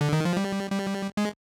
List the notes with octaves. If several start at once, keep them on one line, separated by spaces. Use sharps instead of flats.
D3
D#3
F3
G3
G3
G#3